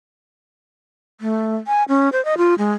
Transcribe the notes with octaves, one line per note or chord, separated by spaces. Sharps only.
A3
G#5
C#4
C5
D#5
F4
G#3